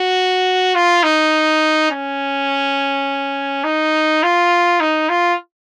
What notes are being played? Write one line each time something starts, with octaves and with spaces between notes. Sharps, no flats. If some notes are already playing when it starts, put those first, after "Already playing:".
Already playing: F#4
F4
D#4
C#4
D#4
F4
D#4
F4